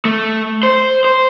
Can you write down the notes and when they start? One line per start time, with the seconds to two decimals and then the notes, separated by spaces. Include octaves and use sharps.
0.05 A3
0.63 C5
1.04 C5